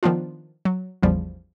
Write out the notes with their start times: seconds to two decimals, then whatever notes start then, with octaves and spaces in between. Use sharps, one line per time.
0.03 D#3 F3 B3 D4 F4
0.65 F#3
1.03 A1 E2 C#3 F3 G3